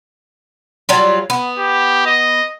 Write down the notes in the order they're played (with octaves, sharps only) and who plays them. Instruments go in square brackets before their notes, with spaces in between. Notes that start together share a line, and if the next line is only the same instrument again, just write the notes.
[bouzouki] F#3 G3 F4
B3
[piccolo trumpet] G4
D#5